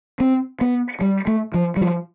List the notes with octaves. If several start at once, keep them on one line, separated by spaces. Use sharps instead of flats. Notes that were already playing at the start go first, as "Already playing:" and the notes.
C4
B3
G3
A3
F3
G3
F3